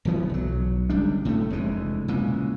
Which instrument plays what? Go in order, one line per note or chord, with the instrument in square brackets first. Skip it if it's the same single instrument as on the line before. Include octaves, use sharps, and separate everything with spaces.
[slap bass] D1 D2 E3 B3
B1 F#3
G1 C#2 G3 D4
A2 A3
F1 D2 E3 G#3
A#2 C#3 E3 G#3